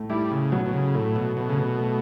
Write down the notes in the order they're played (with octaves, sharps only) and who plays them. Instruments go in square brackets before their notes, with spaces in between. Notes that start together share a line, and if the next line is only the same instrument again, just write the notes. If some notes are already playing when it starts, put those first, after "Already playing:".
Already playing: [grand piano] A2 A3
[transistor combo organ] G3 [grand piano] E4
[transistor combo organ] C#3
[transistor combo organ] B2 [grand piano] F#3
[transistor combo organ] B2
C#3
[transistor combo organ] A2 [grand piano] A3
[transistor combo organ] B2
[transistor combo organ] B2 [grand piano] A3
[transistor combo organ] C#3
B2
[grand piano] A3